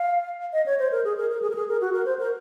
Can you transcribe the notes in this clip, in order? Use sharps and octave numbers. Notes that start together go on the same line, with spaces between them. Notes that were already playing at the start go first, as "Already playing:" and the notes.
Already playing: F5
D#5
C#5
C5
A#4
G#4
A#4
A#4
G#4
A#4
G#4
A#4
F#4
A#4
C5
A#4